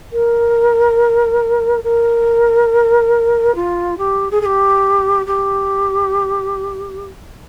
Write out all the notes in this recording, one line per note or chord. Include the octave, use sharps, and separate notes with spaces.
A#4
A#4
F4
G4
G#4
G#4
G4
G4